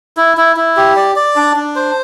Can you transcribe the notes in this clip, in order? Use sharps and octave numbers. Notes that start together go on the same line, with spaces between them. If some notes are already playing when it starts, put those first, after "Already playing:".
E4
E4
E4
G4
D5
D5
D4
D4
C5